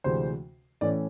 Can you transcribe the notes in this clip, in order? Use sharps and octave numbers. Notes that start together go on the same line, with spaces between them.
D2 C3 E3 G#3 C5
A2 E3 A3 C#4 D5